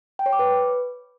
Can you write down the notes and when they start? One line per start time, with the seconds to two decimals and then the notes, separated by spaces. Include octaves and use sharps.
0.19 G5
0.26 C#5
0.33 D6
0.39 B4